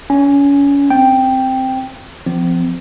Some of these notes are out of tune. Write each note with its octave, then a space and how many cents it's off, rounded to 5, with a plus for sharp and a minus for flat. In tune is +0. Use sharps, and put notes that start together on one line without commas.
C#4 +30 G#5 +0
C4 +0 G5 +0
F3 -10 C4 -35